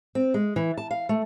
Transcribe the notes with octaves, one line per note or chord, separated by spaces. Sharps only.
C4
G#3
E3
A5
F5
A3